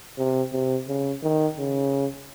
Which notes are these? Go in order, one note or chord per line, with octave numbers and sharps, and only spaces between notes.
C3
C3
C#3
D#3
C#3